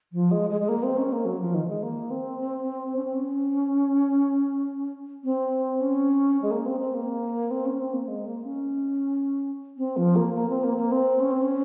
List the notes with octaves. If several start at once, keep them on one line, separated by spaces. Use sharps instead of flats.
F3
G#3
G#3
G#3
A#3
C4
C#4
A#3
F#3
F3
D#3
G#3
A#3
C4
C#4
C4
C#4
C4
C#4
G#3
A#3
C4
C4
A#3
C4
C#4
C4
A#3
G#3
A#3
C#4
C4
F3
A#3
A#3
C4
A#3
A#3
C4
C#4
C4
C#4